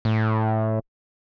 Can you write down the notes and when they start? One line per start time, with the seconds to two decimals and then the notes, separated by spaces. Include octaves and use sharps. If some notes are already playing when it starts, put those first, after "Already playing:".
0.05 A2